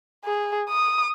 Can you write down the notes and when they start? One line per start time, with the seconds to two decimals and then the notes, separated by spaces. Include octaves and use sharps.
0.25 G#4
0.69 D#6